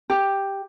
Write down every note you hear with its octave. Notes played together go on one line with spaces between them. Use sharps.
G4